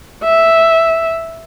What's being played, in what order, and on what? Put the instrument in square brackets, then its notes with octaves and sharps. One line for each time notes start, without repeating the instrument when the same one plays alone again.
[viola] E5